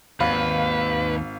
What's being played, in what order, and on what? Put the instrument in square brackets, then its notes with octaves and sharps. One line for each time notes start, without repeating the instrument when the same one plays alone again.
[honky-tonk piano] G#1 F5 [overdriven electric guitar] D#2 [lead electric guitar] B4